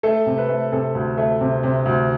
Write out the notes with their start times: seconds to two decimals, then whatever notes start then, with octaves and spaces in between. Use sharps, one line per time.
0.03 A3 A4
0.26 C3
0.38 B4
0.49 A3
0.72 C3 A4
0.95 D2
1.18 A3
1.40 C3
1.63 C3
1.86 D2